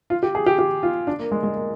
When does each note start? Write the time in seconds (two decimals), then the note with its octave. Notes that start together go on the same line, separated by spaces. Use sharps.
0.10 F4
0.23 G4
0.35 G#4
0.46 G4
0.59 G4
0.83 F4
1.07 D4
1.19 A#3
1.32 G#3
1.43 G#3
1.55 A#3